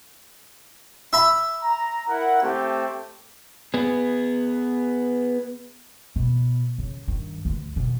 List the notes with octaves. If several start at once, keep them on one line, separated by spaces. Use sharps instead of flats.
E5 B5
A#5
E4 A#4 F#5
A3 C4 G4
B3 G#4
B2
C#3
G2 D#3
D2
B2 B3